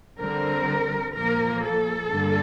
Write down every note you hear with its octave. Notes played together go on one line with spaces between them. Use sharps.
D3 G3 C4 A#4
A#2 F3 A#3 A#4
A4
G2 D3 G3 A#3